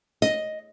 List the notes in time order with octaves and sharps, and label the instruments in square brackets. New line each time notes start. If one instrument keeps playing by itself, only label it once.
[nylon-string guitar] D#5